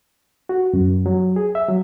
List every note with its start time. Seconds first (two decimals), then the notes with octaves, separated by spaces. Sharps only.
0.49 F#4
0.74 F#2
1.06 F#3
1.36 G#4
1.55 E5
1.69 F#3